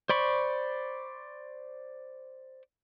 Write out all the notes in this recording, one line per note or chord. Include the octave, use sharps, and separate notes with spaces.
C5 D5 B5 C#6